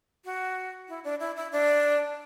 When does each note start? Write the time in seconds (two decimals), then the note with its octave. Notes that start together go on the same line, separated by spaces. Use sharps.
0.25 F#4
0.88 E4
1.04 D4
1.20 E4
1.37 E4
1.52 D4